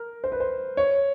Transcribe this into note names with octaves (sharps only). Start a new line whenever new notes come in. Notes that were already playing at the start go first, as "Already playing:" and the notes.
Already playing: A#4
C5
B4
C5
C#5